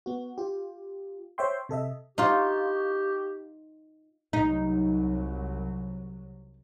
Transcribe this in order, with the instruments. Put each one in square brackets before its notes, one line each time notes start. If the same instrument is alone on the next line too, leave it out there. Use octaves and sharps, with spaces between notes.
[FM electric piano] B3 F#4
F4 G4
C5 C#5 E5 G5 C6
C3 A4 D#5 E5
[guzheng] D#4 F4 [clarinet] G4
[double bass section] C2 F#3 [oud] D#4